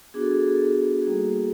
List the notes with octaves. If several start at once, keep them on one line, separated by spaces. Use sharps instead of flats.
B3 D4 F#4 G#4
A4
G#4
A4
G#4
A4
G#4
A4
G#4
G#4
G3 A#3 D#4 F#4 A4